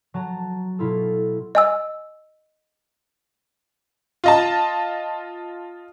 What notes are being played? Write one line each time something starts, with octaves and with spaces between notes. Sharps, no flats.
F#3 A5 A#5
B2 E4 F4 A4
D#5 G#5 E6
F4 D#5 A5